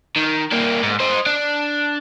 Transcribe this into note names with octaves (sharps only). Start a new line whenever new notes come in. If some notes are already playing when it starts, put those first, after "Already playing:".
D#3
G3 A#3
G#2
C5 D#5
D4